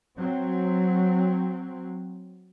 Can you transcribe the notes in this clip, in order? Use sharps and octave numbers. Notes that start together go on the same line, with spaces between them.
F#3 C4